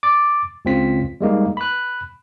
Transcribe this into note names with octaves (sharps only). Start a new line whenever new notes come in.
D6 A6
C#2 C#3 C4 F4 B6
G3 G#3 A#3 D#4
B5 F#6